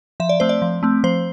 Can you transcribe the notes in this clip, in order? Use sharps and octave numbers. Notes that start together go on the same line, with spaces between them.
F3 E5
D5
A3 C4 C5
D5
F3
A3 C4
F3 C5